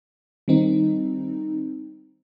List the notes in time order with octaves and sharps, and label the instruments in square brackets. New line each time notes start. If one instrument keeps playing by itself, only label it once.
[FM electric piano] D#3 G3 C4 D#4